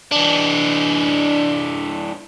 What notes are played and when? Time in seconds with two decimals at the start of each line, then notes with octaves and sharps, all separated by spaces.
0.12 E3 D4